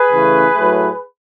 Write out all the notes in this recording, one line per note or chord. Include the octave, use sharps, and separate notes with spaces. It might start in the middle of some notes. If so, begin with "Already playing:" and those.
Already playing: G#4 B4
C#3 E3 A3 C#4
A2 F#3 A3